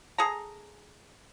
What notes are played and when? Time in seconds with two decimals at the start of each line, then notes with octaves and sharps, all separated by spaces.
0.18 G#4 A4 A#5